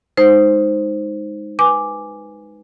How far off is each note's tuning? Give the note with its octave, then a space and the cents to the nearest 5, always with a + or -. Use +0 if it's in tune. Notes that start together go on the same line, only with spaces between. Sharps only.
G#3 +0 D#4 +0 C5 +0
B4 +0 G#5 +0 D6 +0